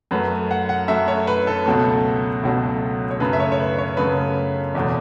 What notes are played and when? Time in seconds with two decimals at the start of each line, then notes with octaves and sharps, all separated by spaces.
0.11 F#2 F#3 A3 B4
0.51 F#5
0.69 F#5
0.88 F#2 F#3 A3 E5
1.08 C#5
1.27 B4
1.47 A4
1.66 C#2 B2 F#3 A3
2.43 C#2 B2 F#3 A3
3.10 C#5
3.20 F#2 C#3 A3 B4
3.33 E5
3.40 C#5
3.52 C#5
3.60 B4
3.78 C#5
3.97 F#2 C#3 A3 B4
4.75 E2 B2 A3